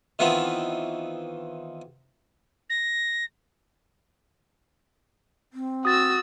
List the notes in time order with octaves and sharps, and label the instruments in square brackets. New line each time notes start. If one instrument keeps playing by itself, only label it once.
[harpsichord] D#3 E3 B3 C4 F4
[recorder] A#6
[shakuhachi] C4
[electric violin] F#4 E6 [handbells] D#6 A6